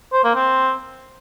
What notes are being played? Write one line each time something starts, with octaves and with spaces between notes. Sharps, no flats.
C5
A#3
C4